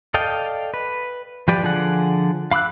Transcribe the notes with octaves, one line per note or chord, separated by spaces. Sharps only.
A4 D5 D#5 F5 G5
B4
F3 G4 B4 D5
D3 F3 G#4 D5 F#5
F5 B5 D6 E6 F#6